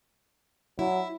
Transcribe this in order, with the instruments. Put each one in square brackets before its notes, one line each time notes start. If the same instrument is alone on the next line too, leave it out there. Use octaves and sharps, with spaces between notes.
[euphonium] F#3 [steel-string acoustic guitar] E4